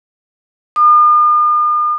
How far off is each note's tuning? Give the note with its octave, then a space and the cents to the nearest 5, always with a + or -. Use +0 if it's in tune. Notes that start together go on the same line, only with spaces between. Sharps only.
D#6 -45